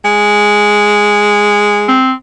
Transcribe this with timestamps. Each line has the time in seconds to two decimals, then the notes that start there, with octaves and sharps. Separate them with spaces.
0.04 G#3
1.88 C4